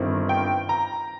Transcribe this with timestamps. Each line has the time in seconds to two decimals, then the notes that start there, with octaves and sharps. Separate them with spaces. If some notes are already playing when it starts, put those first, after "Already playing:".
Already playing: G1 G2 D#3 C4 D#4
0.29 G5
0.69 A#5